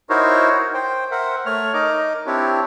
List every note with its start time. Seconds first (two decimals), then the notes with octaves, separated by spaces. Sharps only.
0.10 D#4 E4 F#4 A#4 C5 C#5
0.74 C5 G5
1.11 A#4 C5 E5 F#5
1.46 A3 C#5 F6
1.74 D#4 A#4 D#5 D6
2.26 C4 D4 E4 G4 C#5